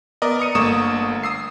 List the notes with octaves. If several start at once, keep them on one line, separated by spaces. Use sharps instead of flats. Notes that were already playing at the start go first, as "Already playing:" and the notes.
B3 A#4 D5 D#5
A#5 D#6 C#7 D#7
G1 A3 A#3 C#6 D#6 E7
D#6 E6 C7